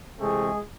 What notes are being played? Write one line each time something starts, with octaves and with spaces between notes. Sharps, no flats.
C3 E3 G#3 A3 C4 G#4